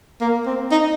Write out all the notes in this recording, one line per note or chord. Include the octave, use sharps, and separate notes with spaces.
A#3
C4
D#4